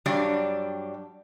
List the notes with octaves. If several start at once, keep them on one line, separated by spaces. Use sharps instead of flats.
G2 F#3 G3 D4